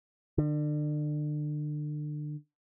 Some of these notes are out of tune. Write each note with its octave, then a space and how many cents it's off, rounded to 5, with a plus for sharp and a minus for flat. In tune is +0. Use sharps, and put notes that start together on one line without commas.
D3 +30